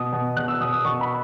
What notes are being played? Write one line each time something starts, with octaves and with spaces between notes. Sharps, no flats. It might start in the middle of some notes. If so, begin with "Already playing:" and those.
Already playing: B2 D#6
B2
B2 F#6
E6
B2 D#6
D#6
B2 C#6
B5